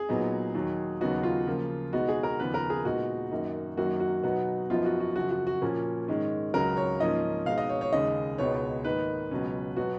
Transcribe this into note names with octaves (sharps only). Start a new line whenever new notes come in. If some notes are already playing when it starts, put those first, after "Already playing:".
Already playing: G#4
A#2 F#3 B3 D#4
D#2 D#3 F#3
D#2 C#3 F#3 B3 D#4 F#4
F4
C#3 F3 A#3
B2 G#3 B3 D#4 F#4
G#4
A#4
D#2 C#3 F3 B3 B4
A#4
G#4
A#2 G#3 B3 D#4 F#4
F#2 D#3 A#3 D#4
F#2 D#3 F#3 A#3 F#4
F#4
B2 F#3 B3 D#4 F#4
F#2 F3 B3 D#4 F4
F#4
F#4
F#2 C#3 F3 F#4
F#4
F#4
A#2 F3 A#3 C#4
G#2 D#3 G#3 C#4
C#2 C#3 F#3 A#4
C#5
G#2 F3 A#3 C#4 D#5
B2 G#3 D#4 F5
D#5
C#5
C#5
D#2 C#3 G#3 D#5
C#2 B2 G#3 B3 D#4 C#5
G#2 D#3 A#3 D#4 B4
C#2 B2 F#3 C#4
B2 F#3 B3 F#4